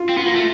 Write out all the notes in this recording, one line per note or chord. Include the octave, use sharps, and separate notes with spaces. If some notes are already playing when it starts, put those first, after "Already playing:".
Already playing: F4
C4
B3 F4
A#3
A3